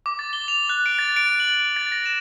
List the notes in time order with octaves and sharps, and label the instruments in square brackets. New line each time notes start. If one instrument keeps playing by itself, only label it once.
[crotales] D6
A6
G7
F7
F#6
D7
A6
D7
F#7
A6
A#6
E7